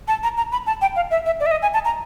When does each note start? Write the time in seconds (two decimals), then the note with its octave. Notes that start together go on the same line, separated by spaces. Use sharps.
0.08 A5
0.23 A#5
0.37 A#5
0.52 B5
0.67 A5
0.82 G5
0.96 F5
1.11 E5
1.26 E5
1.40 D5
1.46 E5
1.51 D#5
1.62 G#5
1.74 A5
1.85 A#5